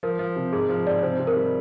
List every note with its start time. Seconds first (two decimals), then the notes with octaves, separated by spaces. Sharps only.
0.03 F3 A#4
0.19 F3
0.36 C3
0.53 G#2 G#4
0.69 F3
0.87 G#2 D5
1.03 C3 C5
1.20 C3
1.27 A#4
1.37 G3